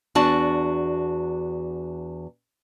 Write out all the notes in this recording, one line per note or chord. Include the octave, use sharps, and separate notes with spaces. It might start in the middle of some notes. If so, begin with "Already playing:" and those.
E2 D4 F#4 D5 A5